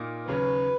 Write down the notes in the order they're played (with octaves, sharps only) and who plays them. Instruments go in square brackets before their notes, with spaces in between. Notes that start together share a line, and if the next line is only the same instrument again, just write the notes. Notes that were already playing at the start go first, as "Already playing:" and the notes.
Already playing: [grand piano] A#2 A#3 D#4
[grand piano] D#2 C#3 F#3 C#4 G#4 [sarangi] B4